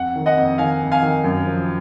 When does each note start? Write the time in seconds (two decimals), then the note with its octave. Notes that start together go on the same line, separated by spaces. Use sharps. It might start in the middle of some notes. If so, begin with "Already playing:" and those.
Already playing: F2 F#5
0.16 D#3
0.26 D#5 F#5
0.37 F2
0.58 D#3 F5 G#5
0.81 F2
0.92 F5 G#5
1.02 D#3
1.24 F#2
1.46 F3